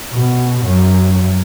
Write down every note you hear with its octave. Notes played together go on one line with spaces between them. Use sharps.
B2
F#2